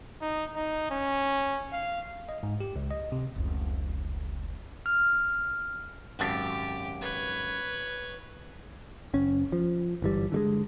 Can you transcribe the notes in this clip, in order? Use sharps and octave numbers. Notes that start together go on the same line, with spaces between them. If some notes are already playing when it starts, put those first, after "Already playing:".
D#4
D#4
C#4
F5
D#5
G#2
G4
C#2
D#5
C3
F1 C#2
F6
G#1 F#2 G4 A5
B4 C#5
F#1 C#4
F3
G1 E3 G3
D3 G3 G#3